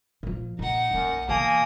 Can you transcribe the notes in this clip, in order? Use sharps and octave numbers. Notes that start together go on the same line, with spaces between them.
A#2 F3
A#2 D#4 F#5
B1 F#2 A#3
B2 E3 A#3 G#5 A5 D#6